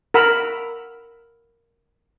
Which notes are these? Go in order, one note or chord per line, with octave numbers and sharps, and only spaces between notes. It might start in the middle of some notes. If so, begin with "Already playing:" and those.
A#4 F#5 B5 E6